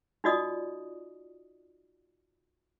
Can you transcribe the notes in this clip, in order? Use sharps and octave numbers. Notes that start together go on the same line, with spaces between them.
D#4 F4 F#4 D5 D#5 D#6